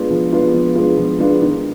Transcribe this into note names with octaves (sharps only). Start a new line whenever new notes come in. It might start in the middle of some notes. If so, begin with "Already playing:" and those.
Already playing: G#3 B3 D4 F4
F3
G#3 B3 D4 F4
F3
G#3 B3 D4 F4
F3
G#3 B3 D4 F4
D#3